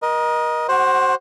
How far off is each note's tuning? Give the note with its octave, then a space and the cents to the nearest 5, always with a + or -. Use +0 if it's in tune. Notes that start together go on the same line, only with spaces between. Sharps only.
A#4 +35 D#5 +0
F#4 +30 C5 +15 F#5 +0